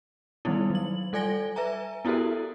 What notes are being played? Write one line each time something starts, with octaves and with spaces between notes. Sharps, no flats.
D#3 G3 B3 D#4 E4
F#3 F#7
G3 A4 D5 G#5 A#6 G7
B4 E5 G#5 A#5
B3 E4 F#4 G4 A4 A#4